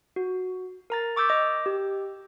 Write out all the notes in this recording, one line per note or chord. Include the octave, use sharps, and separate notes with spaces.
F#4
A#4 A#5 A6
C#6 D6 E6 G6 A6 B6
D#5 D6
G4